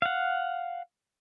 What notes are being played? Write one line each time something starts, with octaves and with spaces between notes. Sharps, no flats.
F5 F#5